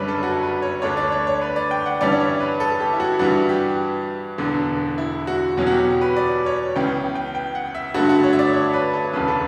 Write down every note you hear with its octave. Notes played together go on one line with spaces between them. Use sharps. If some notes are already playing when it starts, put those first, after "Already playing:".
Already playing: G1 F#2 C#3 G3 D4 B4 C#5
A4
F#4
B4
C#5
D2 D3 A3 D4 C#5
D5
C#5
C#5
B4
D5
G5
F#5
G2 E3 G3 C#4 D5
D5
C#5
B4
A4
G4
E4
F#4
E4
G2 E3 G3 F#4
G4
E1 E2 D3
E4
F#4
E2 B2 F#3 C#4
F#4
G4
B4
D5
C#5
C#2 C#3 E3 B3 G5
G5
G5
F#5
E5
G2 D3 A3 F#4
F#4
C#5
E5
D5
C#5
B4
A4
E1 D2 C#3 E3 B4
A4